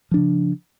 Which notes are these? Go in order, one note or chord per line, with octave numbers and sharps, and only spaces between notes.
C#3 F3 D4